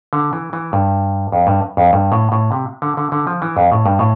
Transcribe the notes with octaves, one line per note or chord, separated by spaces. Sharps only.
D3
E3
E3
G2
F2
G2
F2
G2
A2
A2
C3
D3
D3
D3
F3
E3
F2
A2
G2
A2